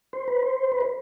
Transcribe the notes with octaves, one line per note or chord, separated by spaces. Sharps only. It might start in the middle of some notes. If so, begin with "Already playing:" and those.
C5
B4
C5
B4
C5